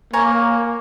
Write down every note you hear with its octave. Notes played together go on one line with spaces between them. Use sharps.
A#3 C#5 G#5 A#5